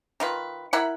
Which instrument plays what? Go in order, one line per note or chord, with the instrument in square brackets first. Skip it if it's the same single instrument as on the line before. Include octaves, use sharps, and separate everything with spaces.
[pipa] D#3 F4 B4
E4 A#4 F#5 B5